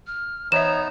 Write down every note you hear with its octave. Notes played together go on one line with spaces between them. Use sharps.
F6
E3 B3 D#4 C#5 E5 A#5 E7